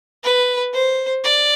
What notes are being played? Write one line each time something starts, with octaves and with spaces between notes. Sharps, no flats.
B4
C5
D5